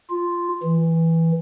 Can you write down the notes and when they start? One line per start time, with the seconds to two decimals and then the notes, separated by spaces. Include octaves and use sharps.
0.10 F4
0.63 E3